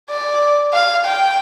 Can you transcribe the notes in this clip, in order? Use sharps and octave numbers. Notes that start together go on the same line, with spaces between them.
D5
F5
G5